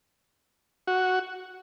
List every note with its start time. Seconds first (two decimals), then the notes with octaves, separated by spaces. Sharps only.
0.87 F#4